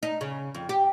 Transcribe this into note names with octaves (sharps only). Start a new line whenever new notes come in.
D#4
C#3
F2
G4